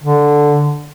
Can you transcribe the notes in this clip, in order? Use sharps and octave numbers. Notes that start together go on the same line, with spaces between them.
D3